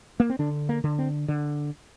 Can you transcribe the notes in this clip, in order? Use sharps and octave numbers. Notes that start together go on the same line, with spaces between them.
A#3
C4
D3 D4
A#3
D3
C4
D3